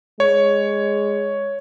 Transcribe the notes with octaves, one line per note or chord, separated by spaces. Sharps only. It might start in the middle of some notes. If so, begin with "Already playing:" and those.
G#3 C#5